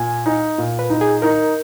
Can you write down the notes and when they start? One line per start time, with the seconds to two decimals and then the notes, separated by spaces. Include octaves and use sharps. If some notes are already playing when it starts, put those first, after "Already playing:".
Already playing: A#2 G#5
0.26 D#4
0.58 A#2
0.79 B4
0.90 D#4
1.01 G#4
1.22 D#4 A#4